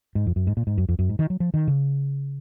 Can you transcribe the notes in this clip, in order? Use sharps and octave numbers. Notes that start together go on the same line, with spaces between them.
G#2
F2
F#2
G#2
A#2
G#2
F#2
F2
F#2
G#2
D#3
F#3
F3
D#3
C#3